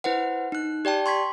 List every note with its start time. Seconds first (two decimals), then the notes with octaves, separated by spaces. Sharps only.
0.04 E4 B4 C5 F#5
0.52 D#4 F#6
0.85 G4 D5 G5 A5
1.06 C6 C#6 G#6 B6